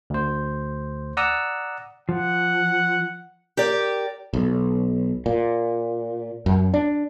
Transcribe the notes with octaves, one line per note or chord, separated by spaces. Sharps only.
D2 C5
D5 F#5 A#5 D#6 E6
F3 F#5
G4 A#4 D5
B1
A#2
F#2
D4